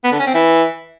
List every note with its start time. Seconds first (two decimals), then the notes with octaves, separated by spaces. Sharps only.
0.04 B3
0.12 D3
0.19 C#4
0.27 C4
0.34 E3